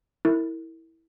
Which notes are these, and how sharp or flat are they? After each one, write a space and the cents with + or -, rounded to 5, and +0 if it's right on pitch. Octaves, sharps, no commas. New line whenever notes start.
E4 -10 A#4 -30